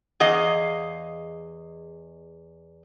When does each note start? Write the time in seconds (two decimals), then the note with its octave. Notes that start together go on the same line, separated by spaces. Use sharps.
0.20 E2 G#4 D#5 F5